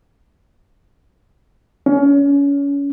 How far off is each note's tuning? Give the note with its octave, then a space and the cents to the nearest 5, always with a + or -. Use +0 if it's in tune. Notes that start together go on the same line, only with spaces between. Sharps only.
C#4 +30